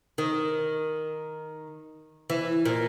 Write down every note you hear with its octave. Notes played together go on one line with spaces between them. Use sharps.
D#3
E3
A#2